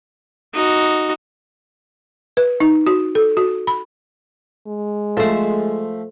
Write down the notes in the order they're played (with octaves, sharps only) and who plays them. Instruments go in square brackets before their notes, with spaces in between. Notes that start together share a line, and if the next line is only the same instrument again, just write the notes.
[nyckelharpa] D#4 F#4
[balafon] B4
D#4
F#4
A4
F#4
B5
[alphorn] G#3
[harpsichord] F3 A3 [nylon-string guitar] A4 C5